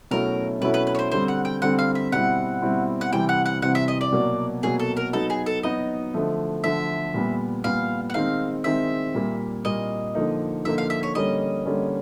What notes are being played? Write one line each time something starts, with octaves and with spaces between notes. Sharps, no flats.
B2 F#3 A3 C#4 E4 A#4
B2 F#3 A3 C#4 E4 B4
B4
B4
C#5
C5
D3 G3 C4 C5
F#5
G5
D3 G3 C4 F#5
F5
E5
B2 G3 C4 E4 F#5
B2 G3 C4 E4
F#5
C3 E3 G3 C4 G5
F#5
F#5
C3 E3 G3 C4 F#5
E5
D#5
D5
B2 F#3 A#3
B2 F#3 A#3 G#4
A4
A#4
F#3 B3 D#4 A4
G#4
A4
F#3 B3 D#4 D#5
D3 F3 A3
D3 F3 A3 E5
A#2 G3 B3
A#2 G3 B3 F5
F#5
D#3 G#3 C4 D#4 F5
D#3 G#3 C4 D#4 E5
A#2 G3 A#3
A#2 G3 A#3 D#5
D3 F3 A#3 D#4
D3 F3 A#3 D#4 E5
F5
E5
C#5
D3 G3 A#3 C#4 D#5
D3 G3 A#3 C#4